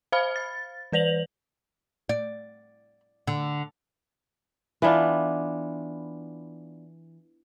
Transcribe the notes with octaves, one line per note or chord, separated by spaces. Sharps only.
C5 F5 B5 F6
A6
E3 B4 D5 F7 F#7
D5
D3
E3 B3 D4 F4